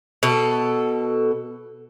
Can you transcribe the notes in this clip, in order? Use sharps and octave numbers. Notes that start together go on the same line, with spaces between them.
B2 A4